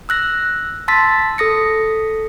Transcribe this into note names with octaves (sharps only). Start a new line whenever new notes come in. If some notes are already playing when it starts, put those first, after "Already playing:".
E6 F#6 A#6
A5 C6 E6 A6 B6
A4 D#6 A#6 C#7